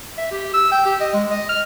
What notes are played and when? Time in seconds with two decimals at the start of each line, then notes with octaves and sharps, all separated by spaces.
0.18 E5
0.31 G4
0.53 E6
0.72 G5
0.85 G4
1.00 D#5
1.14 G#3
1.30 D#5
1.49 F6